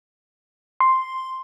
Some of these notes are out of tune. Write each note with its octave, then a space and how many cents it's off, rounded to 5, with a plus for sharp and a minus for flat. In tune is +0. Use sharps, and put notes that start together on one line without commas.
C6 +0